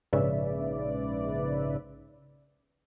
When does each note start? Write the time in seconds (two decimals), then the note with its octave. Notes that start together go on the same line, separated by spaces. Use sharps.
0.13 A#1 G#2 C#3 B4 D5 E5